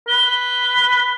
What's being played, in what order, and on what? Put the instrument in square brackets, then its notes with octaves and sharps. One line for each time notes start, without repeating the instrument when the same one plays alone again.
[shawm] B4 [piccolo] G7
[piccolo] G7